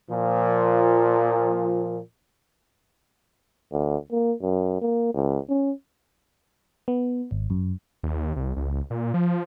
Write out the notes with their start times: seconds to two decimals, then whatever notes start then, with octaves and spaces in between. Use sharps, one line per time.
0.10 A#2 F3
3.72 D2
4.12 A#3
4.42 F#2
4.81 A#3
5.14 C#2
5.49 C#4
6.88 B3
7.31 G#1
7.50 F#2
8.03 D#2
8.36 C2
8.57 C#2
8.90 A#2
9.14 F3